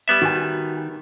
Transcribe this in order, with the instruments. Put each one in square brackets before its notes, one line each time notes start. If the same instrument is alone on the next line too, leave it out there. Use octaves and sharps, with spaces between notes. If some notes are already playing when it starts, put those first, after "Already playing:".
[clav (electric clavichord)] G3 B3 E5
[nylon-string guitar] D#3 [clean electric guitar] F#4 G#5